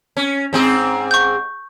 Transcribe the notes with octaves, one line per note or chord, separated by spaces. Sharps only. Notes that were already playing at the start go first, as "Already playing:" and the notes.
C#4
G#2 C4 G#4
C#6 G6